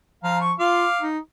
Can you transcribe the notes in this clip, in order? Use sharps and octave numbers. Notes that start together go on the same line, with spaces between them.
F3 F5 A#5
C#6
F4 F5 D6
D#4